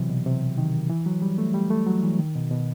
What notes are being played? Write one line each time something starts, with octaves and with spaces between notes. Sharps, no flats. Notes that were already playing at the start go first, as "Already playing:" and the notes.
Already playing: C3 E3 F#3
B2
C3
D#3
E3
F#3
G3
A3
G3
A3
F#3
E3
D#3
B2
B2